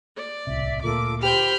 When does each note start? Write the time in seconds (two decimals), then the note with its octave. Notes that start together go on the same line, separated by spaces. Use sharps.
0.16 D5
0.47 D1 C2 C3 E5
0.83 D2 A#2 F4 A4 A#4 D6
1.23 G4 C5 G5 B5 F6 G6